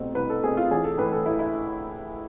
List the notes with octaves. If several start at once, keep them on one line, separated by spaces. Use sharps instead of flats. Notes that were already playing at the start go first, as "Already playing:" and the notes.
Already playing: C2 B2 A3 C4
C2 B4
A4
B2 A3 C4 G#4
F4
A1 G#4
A4
A2 E3 B4
A4
A1 E4
E4